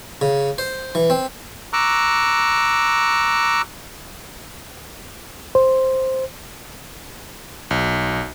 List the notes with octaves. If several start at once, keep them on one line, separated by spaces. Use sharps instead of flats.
C#3
C5
E3
C4
A#5 C#6 D6 E6 F#6
C5
B1